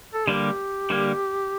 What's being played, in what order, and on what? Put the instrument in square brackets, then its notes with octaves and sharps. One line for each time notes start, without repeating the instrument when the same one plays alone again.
[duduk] A4
[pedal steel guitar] D3 G3 A#3 [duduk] G4
[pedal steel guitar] D3 G3 A#3